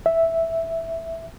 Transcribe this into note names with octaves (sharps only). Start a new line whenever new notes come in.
E5